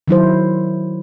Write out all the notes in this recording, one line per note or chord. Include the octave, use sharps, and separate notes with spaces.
D#3 F#3 E4 C5